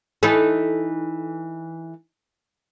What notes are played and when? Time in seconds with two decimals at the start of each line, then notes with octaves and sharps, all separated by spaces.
0.23 E3 D#4 A4